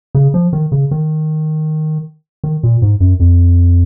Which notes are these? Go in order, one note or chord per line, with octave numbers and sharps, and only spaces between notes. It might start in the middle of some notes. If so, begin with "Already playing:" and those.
C#3
F3
D#3
C#3
D#3
D#3
A#2
G#2
F#2
F2